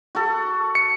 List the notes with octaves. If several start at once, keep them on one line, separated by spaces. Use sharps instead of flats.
F#4 A4
C#7